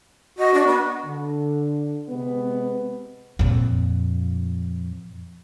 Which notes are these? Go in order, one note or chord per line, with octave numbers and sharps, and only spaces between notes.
F#4 D#5
D4
B3
D3
C3 G#3 B3
F2 A#2